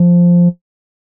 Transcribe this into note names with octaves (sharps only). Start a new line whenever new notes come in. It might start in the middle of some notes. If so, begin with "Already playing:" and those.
Already playing: F3